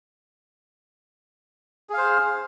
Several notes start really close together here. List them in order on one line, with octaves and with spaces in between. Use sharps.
G#4 F5 C5